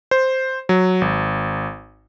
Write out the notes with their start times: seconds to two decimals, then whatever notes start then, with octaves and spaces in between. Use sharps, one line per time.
0.11 C5
0.69 F#3
1.01 G#1